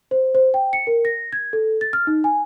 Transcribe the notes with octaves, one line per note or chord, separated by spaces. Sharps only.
C5
C5
G5
C#7
A#4
A#6
G#6
A4
A6
F6
D#4
G#5